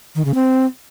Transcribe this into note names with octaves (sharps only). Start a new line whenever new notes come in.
D#3
C#3
C4